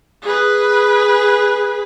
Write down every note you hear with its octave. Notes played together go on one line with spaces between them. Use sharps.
G#4 B4